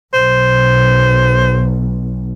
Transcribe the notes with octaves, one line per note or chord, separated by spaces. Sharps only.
B1 C5